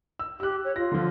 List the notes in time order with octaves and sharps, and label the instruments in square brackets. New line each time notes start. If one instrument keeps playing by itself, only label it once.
[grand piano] E6
[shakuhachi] G4 [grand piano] E6 F#6
[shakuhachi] C#5
[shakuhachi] F4 [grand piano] A#6
[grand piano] D3 F3